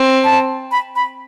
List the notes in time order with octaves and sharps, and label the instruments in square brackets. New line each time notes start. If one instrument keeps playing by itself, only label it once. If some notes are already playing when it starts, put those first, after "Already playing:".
Already playing: [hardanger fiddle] C4
[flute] A5
B5
B5